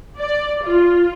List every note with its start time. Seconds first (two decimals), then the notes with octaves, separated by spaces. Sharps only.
0.18 D5
0.63 F4